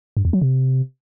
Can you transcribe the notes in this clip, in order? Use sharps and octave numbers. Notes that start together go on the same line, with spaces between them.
G2
E2
F#3
C3